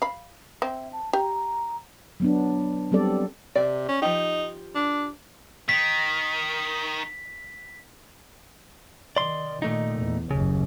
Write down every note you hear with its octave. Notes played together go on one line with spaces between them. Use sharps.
F5 B5
C4 E5
A5
G4 A#5
F#3 B3 D4
F#3 G3 B3 C4 A4 D5
C3 D5
C#4
F3 D#4 G4
D4
D#3 B6
D#3 D5 C6
A#2 D#3 A3 D#4
E2
F#1 D#2 C#3